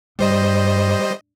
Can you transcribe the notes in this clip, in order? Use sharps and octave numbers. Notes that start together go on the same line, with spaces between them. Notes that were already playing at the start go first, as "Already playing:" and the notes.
G2 G3 C5 D#5